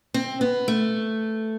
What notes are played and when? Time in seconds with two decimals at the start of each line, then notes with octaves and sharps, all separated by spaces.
0.14 C4
0.41 B3
0.68 A3